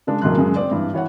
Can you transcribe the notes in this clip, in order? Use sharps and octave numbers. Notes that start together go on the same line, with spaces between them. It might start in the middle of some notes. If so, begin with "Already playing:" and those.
C#3 G#3 D4
E1 C#2 A2 F#3 C6 F#6
F#2 C#3 G#3
C4 D5
G2 E3
E3 C#5 F#5